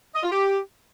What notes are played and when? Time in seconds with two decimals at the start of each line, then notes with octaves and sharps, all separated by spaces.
0.15 D#5
0.23 F4
0.31 G4